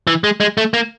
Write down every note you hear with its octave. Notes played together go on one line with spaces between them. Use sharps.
E3
G#3
G#3
A3
A#3